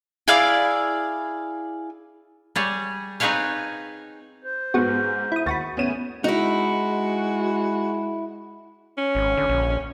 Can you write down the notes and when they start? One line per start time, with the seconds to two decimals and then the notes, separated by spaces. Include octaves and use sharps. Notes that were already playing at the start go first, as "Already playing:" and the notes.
0.28 E4 G#4 D5 F5
2.56 G3 G#4 C#5
3.20 C4 D#4 G#4 B4 C#5 F5
4.44 C5
4.74 G#2 G#3 B3 F#4
5.32 E4 D#6
5.46 D#2 F#4 B5 C#6 A6
5.77 G#2 A3 B3 C#4 G#5 D#7
6.24 G#3 D#4 E4 F#4
8.98 C#4
9.15 G#1
9.37 D3
9.49 A#1